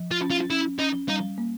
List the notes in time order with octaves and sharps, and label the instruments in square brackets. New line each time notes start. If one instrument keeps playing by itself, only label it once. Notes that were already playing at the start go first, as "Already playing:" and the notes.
Already playing: [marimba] F3
[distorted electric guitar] F4
[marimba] C#4
[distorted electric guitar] F4
[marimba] C#4 [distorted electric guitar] E4
[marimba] C#4 [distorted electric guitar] D#4
[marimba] G3 [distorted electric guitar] D#4
[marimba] A#3